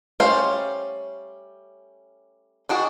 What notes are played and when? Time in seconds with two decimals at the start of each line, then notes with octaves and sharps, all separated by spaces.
0.20 G3 A3 C#4 C5 F5
2.69 D#3 D4 F#4 G#4